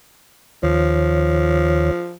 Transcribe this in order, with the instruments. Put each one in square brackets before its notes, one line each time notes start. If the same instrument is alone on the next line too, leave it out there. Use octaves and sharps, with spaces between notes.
[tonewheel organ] D#2 D#3 C#5 [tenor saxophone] F3